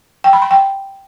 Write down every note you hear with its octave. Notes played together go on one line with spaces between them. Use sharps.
G5
B5
C6
G5